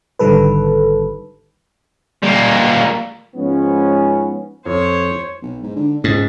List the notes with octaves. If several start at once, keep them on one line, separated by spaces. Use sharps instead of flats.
G#1 D3 D#3 G3 A4 B4
G3 A#3
G#2 F3 B3 C#4
F2 F3 C5 C#5
B1
G#2
D3
C#2 G#2